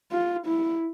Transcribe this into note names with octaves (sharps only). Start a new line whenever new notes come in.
F4
E4